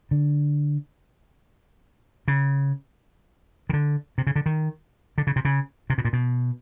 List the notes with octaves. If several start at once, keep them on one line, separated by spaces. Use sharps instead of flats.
D3
C#3
D#3
D3
C3
C#3
D3
D#3
D3
C#3
C3
C#3
C3
B2
A#2
B2